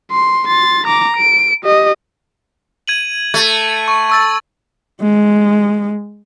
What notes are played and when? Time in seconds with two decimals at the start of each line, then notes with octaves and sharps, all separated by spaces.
0.11 C6
0.47 C6 A6
0.87 A#5 D6
1.17 D7
1.64 G4 D#5
2.88 G#6 D#7 F#7
3.34 A3 G#6
3.88 C#6
4.10 C#6 E6 A6
5.01 G#3